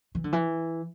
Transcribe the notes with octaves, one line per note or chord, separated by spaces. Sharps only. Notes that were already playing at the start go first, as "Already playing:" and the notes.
E3
D3
E3